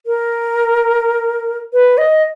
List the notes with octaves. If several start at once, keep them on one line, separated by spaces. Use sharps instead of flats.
A#4
B4
D#5